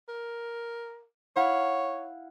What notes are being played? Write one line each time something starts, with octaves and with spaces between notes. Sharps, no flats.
A#4
E4 C#5 F5 F#5